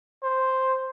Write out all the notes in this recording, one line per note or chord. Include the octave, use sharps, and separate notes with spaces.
C5